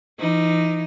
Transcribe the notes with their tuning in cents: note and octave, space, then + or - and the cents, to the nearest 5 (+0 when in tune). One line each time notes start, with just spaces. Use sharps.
E3 +35 D#4 +0